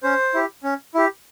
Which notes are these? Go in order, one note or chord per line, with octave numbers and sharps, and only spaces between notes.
C#4 C5
E4 G4
C#4
E4 G4